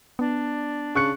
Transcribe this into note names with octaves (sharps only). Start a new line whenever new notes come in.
B3 D4
C#3 C#6 F#6 C#7